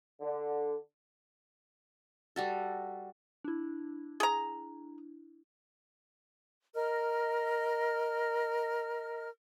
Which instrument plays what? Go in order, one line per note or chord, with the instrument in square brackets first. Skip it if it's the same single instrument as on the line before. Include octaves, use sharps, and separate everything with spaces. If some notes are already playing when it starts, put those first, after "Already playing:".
[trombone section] D3
[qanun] G3 F#4 A4
[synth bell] D4 E4
[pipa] G#4 A#5
[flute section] A#4 D#5 F6